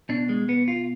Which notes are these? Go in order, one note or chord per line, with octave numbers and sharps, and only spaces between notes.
B2 D4
G#3
B3
F4